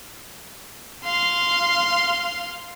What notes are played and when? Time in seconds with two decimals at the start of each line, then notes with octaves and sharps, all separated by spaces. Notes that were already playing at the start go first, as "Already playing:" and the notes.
1.05 F5 C6